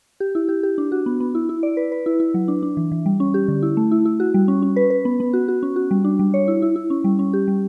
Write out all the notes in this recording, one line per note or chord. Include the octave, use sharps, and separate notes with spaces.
G4
E4
G4
G4
D4
F#4
B3
B3
E4
E4
D5
B4
B4
E4
E4
F#3
D4
D4
E3
E3
G3
C#4
G4
D3
E4
A3
E4
E4
F#4
G3
C#4
C#4
B4
B4
B3
B3
F#4
F#4
C#4
F#4
G3
D4
G3
C#5
E4
E4
E4
C#4
G3
C#4
G4
G3